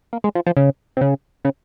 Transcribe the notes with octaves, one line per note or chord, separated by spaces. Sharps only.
A#3
G#3
F3
F3
C#3
C3
C#3
C#3